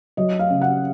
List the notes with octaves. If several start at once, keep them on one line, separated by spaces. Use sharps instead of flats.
F#3 D#5
F5
C#3
F#5